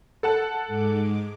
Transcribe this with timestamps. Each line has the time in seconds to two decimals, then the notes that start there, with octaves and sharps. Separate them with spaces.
0.23 A4 F#5 A5
0.67 G#2 G#3 D6